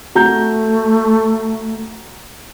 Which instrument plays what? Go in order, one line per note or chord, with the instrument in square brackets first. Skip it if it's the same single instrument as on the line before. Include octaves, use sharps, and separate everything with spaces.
[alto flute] A3 [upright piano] F#4 A#5 G6